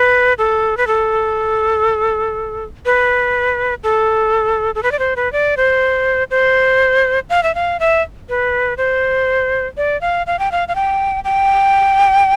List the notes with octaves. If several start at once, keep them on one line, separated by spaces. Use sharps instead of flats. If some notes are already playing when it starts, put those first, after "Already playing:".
Already playing: B4
A4
B4
A4
B4
A4
A4
B4
D5
C5
B4
D5
C5
C5
F5
E5
F5
E5
B4
C5
D5
F5
F5
G5
F5
F5
G5
G5